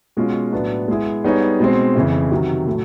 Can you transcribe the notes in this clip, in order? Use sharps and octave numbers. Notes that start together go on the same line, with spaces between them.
B2 G#3 C#4 F4
A2 F#3 B3 D4
G#3 B3 E4 G#4
G3 B3 D#4 G#4 C#5
B2 G#3 C4
F2 C#3 E3
C3 D#3 F#3
A2 F#3 A3